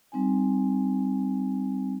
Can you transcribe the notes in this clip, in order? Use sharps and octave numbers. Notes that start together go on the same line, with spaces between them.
G3 C4 D#4 G#5